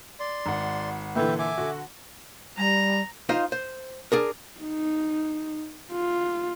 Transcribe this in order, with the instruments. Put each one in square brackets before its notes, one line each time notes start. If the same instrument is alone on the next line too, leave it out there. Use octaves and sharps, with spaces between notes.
[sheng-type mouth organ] D5 C6
[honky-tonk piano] G#1 F#5
[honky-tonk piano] A#2 D3 E3 [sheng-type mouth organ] B4 E5 G5
[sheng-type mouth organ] E5 G#5 D6
[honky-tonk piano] D3 F#4
[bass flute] G3 [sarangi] A#5
[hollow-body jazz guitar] D#4 F4 C5 D#5 F5
C5
D4 G#4 A#4
[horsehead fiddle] D#4
F4